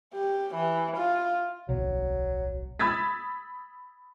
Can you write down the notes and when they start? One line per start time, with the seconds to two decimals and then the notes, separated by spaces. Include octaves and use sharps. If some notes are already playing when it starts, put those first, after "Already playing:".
0.14 G4
0.55 E3
0.97 F4
1.69 D1 B1 F#3
2.79 B5 D#6 E6 G#6 A6 B6